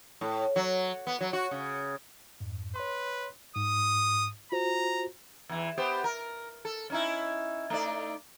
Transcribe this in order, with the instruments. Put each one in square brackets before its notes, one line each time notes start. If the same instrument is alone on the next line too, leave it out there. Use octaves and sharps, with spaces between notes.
[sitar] A2
F#3
B3
F#3
F#4
C#3
[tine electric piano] F2 G#2
[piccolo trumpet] B4 [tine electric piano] C#5 C6
[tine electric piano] G#2 [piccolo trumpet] D#6
[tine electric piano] F4 F#4 C5 [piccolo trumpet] A#5
[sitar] E2 E3
B3 G4 C5
A#4
A4
C#4 D#4 E4
A3 D#4 D5